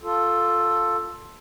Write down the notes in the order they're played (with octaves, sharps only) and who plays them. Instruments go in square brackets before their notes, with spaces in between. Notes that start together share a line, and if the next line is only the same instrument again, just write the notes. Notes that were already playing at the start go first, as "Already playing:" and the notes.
[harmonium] F4 A4